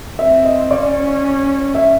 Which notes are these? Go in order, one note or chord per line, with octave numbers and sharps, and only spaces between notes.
C4 E5
D#5
C#4 D5
E5